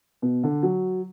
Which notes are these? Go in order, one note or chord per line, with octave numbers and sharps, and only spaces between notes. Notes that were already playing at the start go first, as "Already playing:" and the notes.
B2
D3
F#3